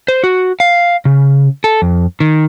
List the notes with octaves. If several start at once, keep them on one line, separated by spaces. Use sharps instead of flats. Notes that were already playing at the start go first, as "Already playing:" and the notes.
C5
F#4
F5
C#3
A4
F2
D#3